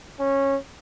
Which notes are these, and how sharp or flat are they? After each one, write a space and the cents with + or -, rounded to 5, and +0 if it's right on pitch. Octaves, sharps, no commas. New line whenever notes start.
C#4 -15